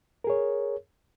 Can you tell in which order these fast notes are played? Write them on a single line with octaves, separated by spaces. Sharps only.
A#4 G#4 C#5